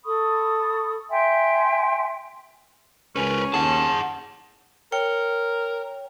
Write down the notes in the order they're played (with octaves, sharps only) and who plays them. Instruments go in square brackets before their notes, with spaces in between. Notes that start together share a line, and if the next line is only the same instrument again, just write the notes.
[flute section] A4 B5 C#6 D#6
E5 G5 G#5 C6
[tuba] C#2 [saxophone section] C#4 [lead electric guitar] A#4 B4
[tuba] D#2 [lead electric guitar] G#4 F#5 [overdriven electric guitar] A5
[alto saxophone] A#4 [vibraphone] C#5 G5